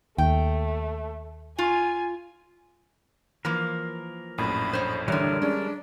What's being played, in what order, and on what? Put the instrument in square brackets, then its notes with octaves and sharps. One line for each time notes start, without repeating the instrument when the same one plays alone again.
[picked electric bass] D#2 [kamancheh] A3 [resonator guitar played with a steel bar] G5
[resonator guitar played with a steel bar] F4 [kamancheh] G#5
[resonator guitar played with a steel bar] E3 F3 A#3 [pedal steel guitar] A#4
[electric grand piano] A#1 F#2 A2 [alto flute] B5
[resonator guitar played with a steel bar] C5 C#5
[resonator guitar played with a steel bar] D3 E3 [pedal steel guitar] G3 A#4 [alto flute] C#5
[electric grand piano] G#3 [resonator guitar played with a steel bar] C#4 [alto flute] D4